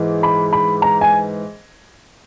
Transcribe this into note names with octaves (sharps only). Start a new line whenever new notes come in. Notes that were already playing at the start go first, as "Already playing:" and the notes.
Already playing: G#2 E3
B5
B5
A#5
G#5